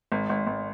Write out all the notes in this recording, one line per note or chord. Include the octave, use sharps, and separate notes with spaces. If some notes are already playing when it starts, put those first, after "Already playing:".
G#1
G#1
G#1